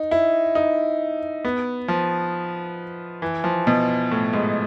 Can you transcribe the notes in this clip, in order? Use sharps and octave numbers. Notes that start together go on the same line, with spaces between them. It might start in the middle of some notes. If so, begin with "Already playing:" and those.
Already playing: D#4
E4
D#4
B3
F3
E3
F3
B2
A2
G#2